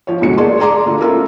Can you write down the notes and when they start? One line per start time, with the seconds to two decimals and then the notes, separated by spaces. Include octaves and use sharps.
0.07 F3 C#5
0.21 F1 E2 G#2 D3 F#4 C#7
0.38 A#3 G#4 D5 A5 C6
0.59 G#4 D5 A#5 C6 D6
0.85 D2 D3 F4 A4
1.00 C#4 E4 F4 A4 A#4